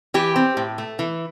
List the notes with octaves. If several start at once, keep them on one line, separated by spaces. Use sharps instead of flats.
E3 G4
C4
A2
A3
E3